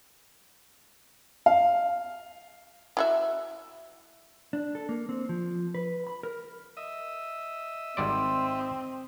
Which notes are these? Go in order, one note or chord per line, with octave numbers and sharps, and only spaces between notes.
F5
E4 F#4 E5
D4
A4
A#3
C4
F3
B4
B5
A#4
D#5 E5
G#1 G3 C4 D5 C6